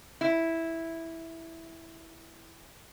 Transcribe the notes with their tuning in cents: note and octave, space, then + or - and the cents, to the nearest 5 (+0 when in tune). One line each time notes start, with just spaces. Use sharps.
E4 -5